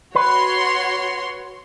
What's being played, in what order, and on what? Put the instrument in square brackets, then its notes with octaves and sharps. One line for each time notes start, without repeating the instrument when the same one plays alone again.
[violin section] F#4 C#5 C6 [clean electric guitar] B4